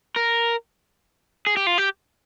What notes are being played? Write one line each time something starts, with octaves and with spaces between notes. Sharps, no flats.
A#4
G#4
G4
F4
G4